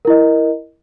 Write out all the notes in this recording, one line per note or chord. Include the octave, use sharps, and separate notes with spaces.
E4 A#4 D#5